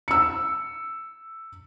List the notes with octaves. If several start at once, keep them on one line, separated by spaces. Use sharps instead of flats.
E6 C#7